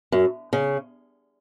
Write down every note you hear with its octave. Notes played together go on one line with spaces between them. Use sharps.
F#2
C#3